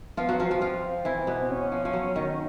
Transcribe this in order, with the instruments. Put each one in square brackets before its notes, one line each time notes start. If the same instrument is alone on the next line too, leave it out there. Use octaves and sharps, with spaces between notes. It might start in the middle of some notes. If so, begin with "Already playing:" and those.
[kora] F3 F4 [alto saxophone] B3
[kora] F#3 F#4 [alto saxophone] B3
[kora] F3 F4 [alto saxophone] C4
[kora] F3 F4
F3 F4
E3 E4
B2 B3
[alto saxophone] C#4
[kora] F3
F3
F#3
D#3